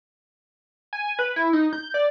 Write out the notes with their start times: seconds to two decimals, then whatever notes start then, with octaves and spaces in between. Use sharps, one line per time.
0.93 G#5
1.19 B4
1.36 E4
1.53 D#4
1.73 G6
1.94 D5